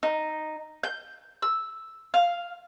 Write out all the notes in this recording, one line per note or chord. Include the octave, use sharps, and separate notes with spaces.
D#4
G6
E6
F5